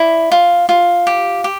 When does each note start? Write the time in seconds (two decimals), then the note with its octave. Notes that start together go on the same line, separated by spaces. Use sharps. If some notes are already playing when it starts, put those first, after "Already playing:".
Already playing: E4 D5 B5
0.32 F4
0.69 F4
1.07 G4
1.44 G4